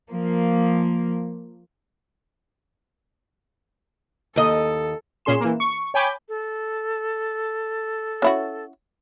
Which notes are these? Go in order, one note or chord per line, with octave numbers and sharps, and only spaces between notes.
F3 A#3
D#2 A4 D#5
A#2 C#4 G#4 C6 E7
E3 A#3
C#6
C#5 G5 G#5 B5 D6 G6
A4
C#4 E4 F#4